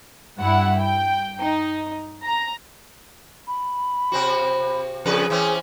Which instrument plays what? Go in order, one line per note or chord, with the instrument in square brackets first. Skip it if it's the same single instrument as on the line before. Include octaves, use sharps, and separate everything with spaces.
[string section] G2 E4 F#5
G5
D#4
A#5
[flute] B5
[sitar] C3 C4 F#4
[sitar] F2 C#3 B4 [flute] G#4
[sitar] E3 C4 C#4